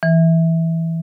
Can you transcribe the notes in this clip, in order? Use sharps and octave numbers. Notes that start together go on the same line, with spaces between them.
E3